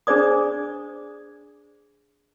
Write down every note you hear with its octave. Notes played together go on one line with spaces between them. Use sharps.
D4 G#4 C5 D5 D#6